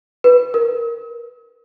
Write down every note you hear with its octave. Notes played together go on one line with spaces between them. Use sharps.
B4
A#4